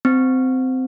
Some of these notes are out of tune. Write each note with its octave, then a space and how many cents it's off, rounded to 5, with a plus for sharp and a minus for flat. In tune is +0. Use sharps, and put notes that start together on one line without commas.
C4 -15